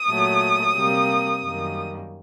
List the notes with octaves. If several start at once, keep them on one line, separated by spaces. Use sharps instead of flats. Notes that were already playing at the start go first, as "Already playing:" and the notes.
Already playing: D#6
A#2 F#3 A3
C3 G3 A#3
F#2 D#3 G3 A#3